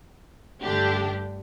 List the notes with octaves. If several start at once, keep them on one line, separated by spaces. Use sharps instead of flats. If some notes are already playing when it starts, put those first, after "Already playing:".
G2 D3 A3 D4 G4